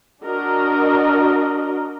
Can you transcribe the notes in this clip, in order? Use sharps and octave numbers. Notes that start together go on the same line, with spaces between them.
D4 F#4 A#4 D#5